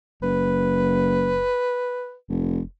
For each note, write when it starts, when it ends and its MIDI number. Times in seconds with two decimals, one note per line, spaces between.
0.22 1.53 30
0.22 2.16 71
2.29 2.61 29